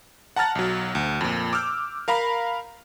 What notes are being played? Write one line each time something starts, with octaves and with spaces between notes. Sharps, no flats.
F#5 A5 A#5 F6 A6
B1 F#3
D2
F2 A#2
D6 E6 F6 G6
A#4 F5 A#5 B5